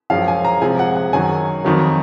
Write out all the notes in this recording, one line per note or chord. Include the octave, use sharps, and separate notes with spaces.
F#2 F3 G#3 F5
G#5
A#5
C3 F3 G#3 G#5
F#5
F#5
F#2 D#3 F#3 G#5
F2 D#3 F#3